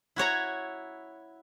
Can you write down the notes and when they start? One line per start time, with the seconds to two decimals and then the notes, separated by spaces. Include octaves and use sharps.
0.16 E4 F#4 C#5 A#5